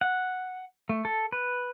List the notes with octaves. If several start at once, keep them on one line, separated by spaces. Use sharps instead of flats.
F#5
A3
A4
B4